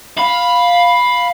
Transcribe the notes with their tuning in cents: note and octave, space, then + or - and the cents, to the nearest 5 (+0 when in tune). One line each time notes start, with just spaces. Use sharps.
F5 +10 B5 +0